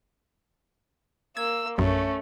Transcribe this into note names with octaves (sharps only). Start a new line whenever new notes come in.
A#3 E6 G#6
A#1 F#2 A3 C#4